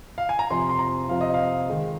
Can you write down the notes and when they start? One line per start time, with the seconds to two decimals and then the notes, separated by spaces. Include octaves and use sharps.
0.18 F5
0.29 G#5
0.39 A#5
0.50 F2 C3 F3 C6
0.69 C6
0.79 A#5
1.08 F2 C3 F3 F5
1.21 D#5
1.34 F5
1.68 D#3 G#3 D#4